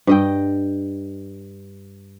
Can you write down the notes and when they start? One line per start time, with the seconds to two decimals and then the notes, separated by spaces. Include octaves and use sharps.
0.07 G2 D#5 G5